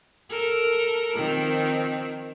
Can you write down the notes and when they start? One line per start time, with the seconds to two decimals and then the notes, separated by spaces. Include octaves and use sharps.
0.30 A4 A#4
1.16 D#3 F3 C4